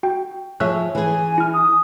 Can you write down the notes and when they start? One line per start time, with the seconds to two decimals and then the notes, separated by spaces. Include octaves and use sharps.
0.03 F#4 G5
0.60 F3 G#4 C#5 E5 E6 F#6
0.95 E3 G#4 G#5
1.38 E4 F6
1.53 D#6